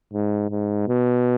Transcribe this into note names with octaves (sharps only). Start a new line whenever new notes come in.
G#2
G#2
B2